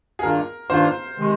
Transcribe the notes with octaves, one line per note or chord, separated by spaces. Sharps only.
G#4
G2 D#3 A#3 D4 F4 A#4
G2 D#3 A#3 D4 F4 C5
C3 D#3 G#3